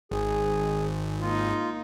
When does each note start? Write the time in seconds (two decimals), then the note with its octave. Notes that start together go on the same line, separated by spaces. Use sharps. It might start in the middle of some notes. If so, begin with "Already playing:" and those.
0.11 G#1 G#4
1.21 A#3 D#4 F4